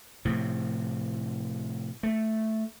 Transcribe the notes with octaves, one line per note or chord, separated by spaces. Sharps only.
A2 C3 F3
A3